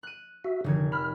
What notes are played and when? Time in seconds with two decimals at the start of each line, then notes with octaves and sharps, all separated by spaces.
0.03 F#6 D#7
0.44 F#4 E5
0.64 F1 D3 D#3 G#6
0.92 B5 F6